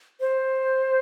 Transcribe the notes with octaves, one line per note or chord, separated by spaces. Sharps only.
C5